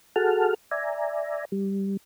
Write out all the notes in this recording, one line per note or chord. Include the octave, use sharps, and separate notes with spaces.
F#4 G#4 A4 F#5 A5 F6
D5 E5 G#5 A#5
G3